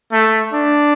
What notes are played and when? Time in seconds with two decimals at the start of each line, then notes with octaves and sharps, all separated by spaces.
0.12 A3
0.53 D4